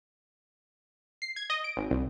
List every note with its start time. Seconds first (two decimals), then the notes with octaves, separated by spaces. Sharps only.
1.22 C7
1.36 G#6
1.50 D#5
1.64 D7
1.77 G#1
1.91 C2